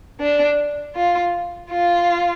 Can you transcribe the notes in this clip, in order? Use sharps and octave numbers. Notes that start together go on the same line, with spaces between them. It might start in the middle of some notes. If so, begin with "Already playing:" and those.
D4
F4
F4